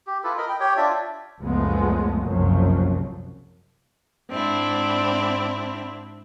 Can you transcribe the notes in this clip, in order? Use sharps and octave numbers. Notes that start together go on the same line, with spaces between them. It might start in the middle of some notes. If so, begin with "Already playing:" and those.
G4
E4 F4 A4 B4
A#4 D#5 B5
G5
G4 C#5 G5
D4 F4 D5 E5
F#1 C#2 F3 G#3 A3 B3
F#1 C2 F#2 F3 F#3
G#2 C4 D4 E4